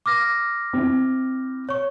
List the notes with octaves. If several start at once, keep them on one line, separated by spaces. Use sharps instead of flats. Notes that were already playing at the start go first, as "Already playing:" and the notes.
D6 F6 A#6
C4 E4
C#5 C#6